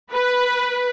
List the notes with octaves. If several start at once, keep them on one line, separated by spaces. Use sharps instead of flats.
B4